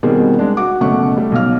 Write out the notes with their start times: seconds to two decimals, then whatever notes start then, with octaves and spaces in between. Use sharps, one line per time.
0.03 B2 D#3 G3 A#3 C4 G#4
0.39 G#3 D4
0.57 F#4 F#5 D6
0.81 F#1 B2 A3 C#4 F#5 C#6
1.17 G3 A3
1.32 B1 B2 F5 F6